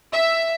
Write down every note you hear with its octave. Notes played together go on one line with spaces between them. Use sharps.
E5